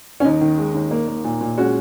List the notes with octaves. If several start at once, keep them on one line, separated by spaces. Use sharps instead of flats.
C#4
D#2 D#4
D#3
G#3
D#2
A#3
A#3
A#2
A#2
G#3 C#4 F#4